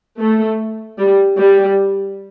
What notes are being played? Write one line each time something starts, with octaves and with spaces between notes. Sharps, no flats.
A3
G3
G3